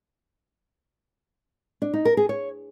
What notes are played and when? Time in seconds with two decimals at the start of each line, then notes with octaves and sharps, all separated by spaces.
1.82 D4
1.94 D#4
2.05 A#4
2.17 G#4
2.29 C#5